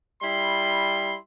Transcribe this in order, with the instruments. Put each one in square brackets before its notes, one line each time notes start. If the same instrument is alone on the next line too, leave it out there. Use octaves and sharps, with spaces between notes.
[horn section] G3 E4 C6